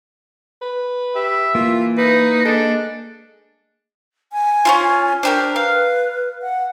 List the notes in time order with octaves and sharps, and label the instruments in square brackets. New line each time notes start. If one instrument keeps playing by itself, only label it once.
[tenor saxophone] B4
[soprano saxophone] G4 [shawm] E5
[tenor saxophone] E3 [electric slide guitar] A#3 [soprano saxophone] F4
[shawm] D#4 [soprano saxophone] B4
[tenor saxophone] G#3 [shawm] D4 [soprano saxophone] A4
[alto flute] G#5
[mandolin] C#4 E4 F4
[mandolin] D4 G4 A#4 [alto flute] C5
[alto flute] B4 [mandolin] F5
[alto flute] F#5